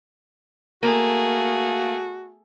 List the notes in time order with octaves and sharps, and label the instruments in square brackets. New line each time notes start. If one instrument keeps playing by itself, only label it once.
[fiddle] A3 G#4 [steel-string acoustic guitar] A#3 [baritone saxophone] F#4